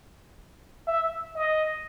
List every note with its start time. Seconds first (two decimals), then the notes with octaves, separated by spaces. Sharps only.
0.87 E5
1.35 D#5